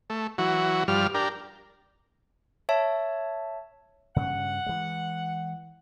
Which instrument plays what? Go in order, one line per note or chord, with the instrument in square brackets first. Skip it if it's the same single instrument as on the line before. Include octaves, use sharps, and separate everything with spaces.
[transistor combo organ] A3
E3 F#3 F#4
G2 F3 G3 F6
D4 G4 A#4
[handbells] C#5 E5 A5
[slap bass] G2 C#3 C#4 [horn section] F#5
[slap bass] E3 G#3